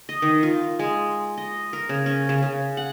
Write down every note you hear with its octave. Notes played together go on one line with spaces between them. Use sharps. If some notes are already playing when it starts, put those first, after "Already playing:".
D#5
D#3
F4
G#3
D#5
A#4
C#3
C#4
C#3
C#3
F#5